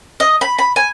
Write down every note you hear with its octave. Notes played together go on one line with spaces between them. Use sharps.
D#5
B5
B5
G#5